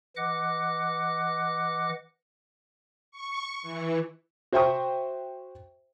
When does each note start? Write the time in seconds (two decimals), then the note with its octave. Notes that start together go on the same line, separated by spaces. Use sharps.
0.17 E3 D#5 F#5 D6 F#6
3.11 C#6
3.62 E3
4.52 F#4 C5 E5 G5 C#6 D#6